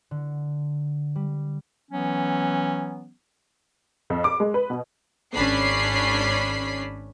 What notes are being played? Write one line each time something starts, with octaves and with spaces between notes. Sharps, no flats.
D3
G3
E3 F#3 B3 C#4
F2
D6
G#3
B4
B2
G#1 C#4 D4 B5 C7